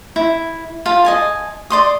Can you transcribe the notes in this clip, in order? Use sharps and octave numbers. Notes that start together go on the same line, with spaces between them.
E4
F4 F5 A5
D#5 G#5 A5
D5 C6 D#6